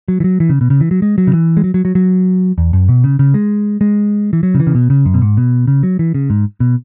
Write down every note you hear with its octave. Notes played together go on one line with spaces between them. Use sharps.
F#3
E3
F#3
E3
C#3
B2
C#3
E3
F#3
G#3
F#3
C#3
E3
G#3
F#3
F#3
F#3
F#3
E2
F#2
B2
C#3
C#3
G#3
G#3
E3
F#3
C#3
E3
C#3
B2
C#3
F#2
B2
G#2
B2
C#3
F#3
E3
C#3
G#2
B2